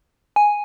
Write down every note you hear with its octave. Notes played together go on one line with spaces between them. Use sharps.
G#5